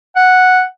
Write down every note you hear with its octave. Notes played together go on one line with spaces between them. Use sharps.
F#5